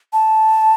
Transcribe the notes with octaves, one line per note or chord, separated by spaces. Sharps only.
A5